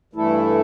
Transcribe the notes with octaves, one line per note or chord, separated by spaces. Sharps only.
G2 E3 A3 E4 A4